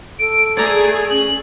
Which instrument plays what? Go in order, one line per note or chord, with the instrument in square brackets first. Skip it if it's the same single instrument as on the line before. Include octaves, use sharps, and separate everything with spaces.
[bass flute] A4 [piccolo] D7
[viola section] A3 G#4 [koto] D5 A#5 [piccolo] G#6
[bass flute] C#4 [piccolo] F#7